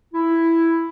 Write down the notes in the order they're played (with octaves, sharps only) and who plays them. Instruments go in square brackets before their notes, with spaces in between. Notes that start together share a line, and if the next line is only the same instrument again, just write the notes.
[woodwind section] E4